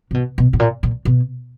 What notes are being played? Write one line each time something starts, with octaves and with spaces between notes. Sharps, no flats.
C3
B2
B2
A2
A#2
A#2
B2